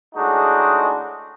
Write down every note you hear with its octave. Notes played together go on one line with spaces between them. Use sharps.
A2 G#3 D4 D#4 F#4